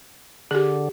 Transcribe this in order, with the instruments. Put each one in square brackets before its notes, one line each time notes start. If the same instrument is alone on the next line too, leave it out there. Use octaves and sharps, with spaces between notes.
[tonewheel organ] D3 [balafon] G4 G#4